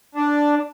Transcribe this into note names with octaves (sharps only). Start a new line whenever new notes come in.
D4